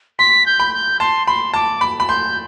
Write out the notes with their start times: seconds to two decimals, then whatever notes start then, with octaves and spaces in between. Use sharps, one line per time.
0.19 C6 B6
0.46 G6
0.60 B5
0.74 G6
1.00 A5 C6
1.27 B5 C6
1.54 A5 D6
1.81 B5
2.00 B5
2.09 C6 G6